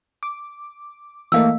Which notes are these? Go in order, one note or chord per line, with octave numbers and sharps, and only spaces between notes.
D6
E3 A3 A#3 D#5 F5 E6